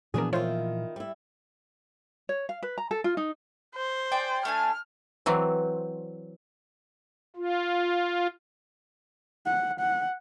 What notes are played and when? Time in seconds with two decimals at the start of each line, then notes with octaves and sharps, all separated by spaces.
0.14 A#2 E3 F3 B3 D4 F#4 G#4 A#4
0.33 D#3 E4 F4 C5 C#5
0.96 G3 E4
2.29 C#5
2.49 F5
2.63 B4
2.78 A#5
2.91 A4
3.04 F4
3.17 D#4
3.75 C5
4.12 G#4 D5 G5
4.45 A3 D4 G#5 F6
5.26 E3 F#3 C4
7.36 F4
9.46 F#5
9.80 F#5